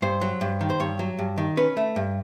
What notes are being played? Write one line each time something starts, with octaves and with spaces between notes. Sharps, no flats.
G2 C5
F#3
G2
D#3
C5
G2 C#5
F#3
G2
D#3
C#4 B4
A3
G2